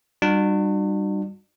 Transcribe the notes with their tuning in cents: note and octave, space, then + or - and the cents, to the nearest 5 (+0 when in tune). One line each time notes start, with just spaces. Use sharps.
G3 +0 D4 +40 F#4 -30